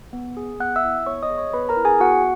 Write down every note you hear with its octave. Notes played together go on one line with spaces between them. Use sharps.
B3
G#4
B3 F#5 F#6
E5 E6
E4
B3 C#5 C#6
D#5 D#6
G#4
C#5 C#6
B3 B4 B5
A#4 A#5
E4
G#4 G#5
B3 F#4 F#5